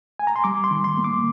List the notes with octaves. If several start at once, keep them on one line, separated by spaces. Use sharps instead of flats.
G#5
A#5
C6
G3 D6
C6
D#3
C6
A#3
D6